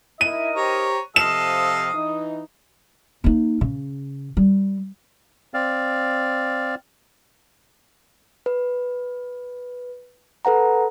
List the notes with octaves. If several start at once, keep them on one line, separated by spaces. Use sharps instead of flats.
D#4 E4 A#4 D#5 D#7
G4 C5 C#5 A#5
C3 F3 A4 D#5 F5 D#6 E7
E3 D#4
A#3 D#4
C#3
G3
C4 D5 F5
B4
A4 B4 F#5 A#5